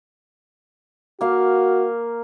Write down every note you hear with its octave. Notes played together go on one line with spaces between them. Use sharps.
A#3 F#4 F5